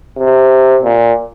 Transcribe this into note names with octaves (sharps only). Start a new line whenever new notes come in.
C3
A#2